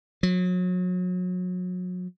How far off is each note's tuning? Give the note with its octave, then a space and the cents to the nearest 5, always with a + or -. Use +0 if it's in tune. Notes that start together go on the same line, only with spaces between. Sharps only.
F#3 -35